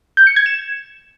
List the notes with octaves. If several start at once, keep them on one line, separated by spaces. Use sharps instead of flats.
G6
C#7
G#6
E7